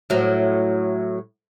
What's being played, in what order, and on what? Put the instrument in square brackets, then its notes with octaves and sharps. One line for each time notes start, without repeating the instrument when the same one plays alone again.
[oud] A2 F#3